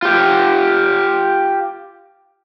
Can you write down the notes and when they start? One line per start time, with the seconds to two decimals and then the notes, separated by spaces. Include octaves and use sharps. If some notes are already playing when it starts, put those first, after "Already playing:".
0.02 F4 G4